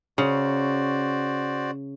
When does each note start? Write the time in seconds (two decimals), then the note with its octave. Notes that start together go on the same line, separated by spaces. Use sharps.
0.18 C#3 F#4 C5 D5